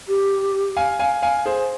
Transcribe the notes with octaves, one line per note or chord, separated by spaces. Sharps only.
G4
F5 G#5
F5 G#5
F5 G#5
G#4 C5